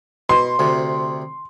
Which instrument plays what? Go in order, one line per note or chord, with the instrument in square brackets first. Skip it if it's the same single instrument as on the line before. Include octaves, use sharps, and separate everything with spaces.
[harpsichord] B2 [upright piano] C6
[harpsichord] D2 C3